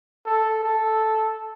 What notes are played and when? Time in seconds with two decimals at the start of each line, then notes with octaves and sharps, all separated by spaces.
0.26 A4
0.64 A4